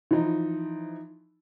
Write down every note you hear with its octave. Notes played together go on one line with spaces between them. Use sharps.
E3 F3 D#4